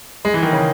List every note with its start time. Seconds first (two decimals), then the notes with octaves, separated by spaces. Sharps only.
0.25 G#3
0.34 E3
0.43 D#3
0.52 C#3